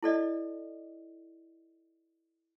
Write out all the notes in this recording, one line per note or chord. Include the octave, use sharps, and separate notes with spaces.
E4 A4 D5 D#5